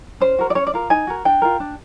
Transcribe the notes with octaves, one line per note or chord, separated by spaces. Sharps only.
C#4 C5
F#4 A#4
D5
C#4 C#5
D5
F4 A#4
D#4 G#5
F#4 A#4
D4 G5
F4 A#4
D4